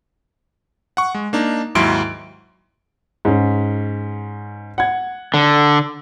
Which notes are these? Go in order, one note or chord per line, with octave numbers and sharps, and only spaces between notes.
F#5 C#6
G#3
A#3 D4 D#4
D#2 G#2 F#3 E4 C6 D7
G#2 C#4
F#5 G#6
D3